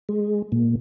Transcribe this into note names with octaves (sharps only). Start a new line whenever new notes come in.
G#3
A#2